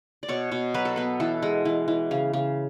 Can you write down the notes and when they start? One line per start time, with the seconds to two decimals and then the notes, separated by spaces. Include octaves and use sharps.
0.23 D5
0.28 B2 C#5
0.52 B2
0.74 F#3 B4
0.85 A4
0.96 B3 B4
1.20 E3 A4
1.42 G#3
1.65 E3
1.88 E3
2.11 C#3
2.33 C#3